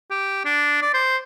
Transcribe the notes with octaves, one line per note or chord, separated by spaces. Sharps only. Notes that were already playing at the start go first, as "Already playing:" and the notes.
G4
D4
D5
C5